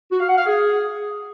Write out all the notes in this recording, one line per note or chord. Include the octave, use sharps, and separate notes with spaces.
F#4
F5
F#5
F5
G#4